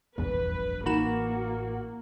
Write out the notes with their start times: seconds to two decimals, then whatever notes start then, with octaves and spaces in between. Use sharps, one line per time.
0.18 F1 A#1 E2 G2 E3 B4
0.86 A1 E3 A#3 D#4 F#4 B5 E7